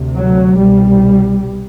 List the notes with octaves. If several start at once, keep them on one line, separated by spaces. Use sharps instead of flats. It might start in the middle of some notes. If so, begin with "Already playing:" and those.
Already playing: D2 C3
F#3
C2 B2 G3